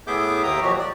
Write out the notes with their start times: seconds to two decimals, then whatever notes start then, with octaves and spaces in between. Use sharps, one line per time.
0.07 A2 B3 G#4 E5 D6 G6
0.43 D#2 A#3 E5 G5 A#5 D#6
0.62 B2 F3 F#3 F#4 G4
0.79 D5